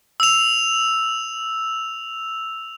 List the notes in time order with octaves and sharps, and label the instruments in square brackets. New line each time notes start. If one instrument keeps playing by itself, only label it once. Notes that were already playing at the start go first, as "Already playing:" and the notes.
[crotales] E6 F7